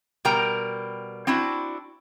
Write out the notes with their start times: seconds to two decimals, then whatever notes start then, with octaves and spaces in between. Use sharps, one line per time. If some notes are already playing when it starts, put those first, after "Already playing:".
0.25 B2 G3 A#4 G5 A#5
1.27 C4 D4 E4 F#4